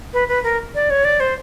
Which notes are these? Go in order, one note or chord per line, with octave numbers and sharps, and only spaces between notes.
B4
B4
A#4
D5
C#5
D5
C5